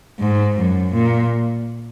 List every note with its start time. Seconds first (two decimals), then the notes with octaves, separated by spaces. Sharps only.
0.19 G#2
0.56 F#2
0.93 A#2